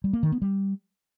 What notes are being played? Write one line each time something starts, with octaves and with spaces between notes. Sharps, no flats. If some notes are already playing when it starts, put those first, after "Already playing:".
G3
A#3
D#3
B3
G3